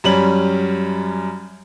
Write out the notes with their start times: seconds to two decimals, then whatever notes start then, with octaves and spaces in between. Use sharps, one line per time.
0.04 F#2 G3 C#4 F#7